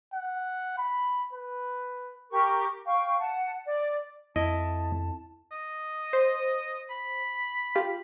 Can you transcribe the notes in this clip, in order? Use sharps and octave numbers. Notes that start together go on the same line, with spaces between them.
F#5
B5
B4
G4 A#4 C#6
F5 G5 C#6
F#5 A5
D5
F2 E4 D#5 A5
D#5
C5
B5
F4 G4